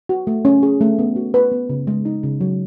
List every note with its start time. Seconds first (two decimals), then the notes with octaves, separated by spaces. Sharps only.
0.09 F#4
0.27 A3
0.45 C#4
0.63 G#4
0.81 A3
0.99 B3
1.16 F#4
1.34 B4
1.52 B3
1.69 C#3
1.87 G#3
2.05 D#4
2.23 C#3
2.41 F#3